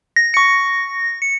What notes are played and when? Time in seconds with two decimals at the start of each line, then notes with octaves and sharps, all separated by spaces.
0.16 A#6
0.34 C#6 C#7
1.22 C#7